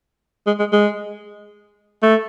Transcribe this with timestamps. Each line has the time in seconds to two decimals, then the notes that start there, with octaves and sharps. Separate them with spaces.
0.47 G#3
0.59 G#3
0.73 G#3
2.03 A3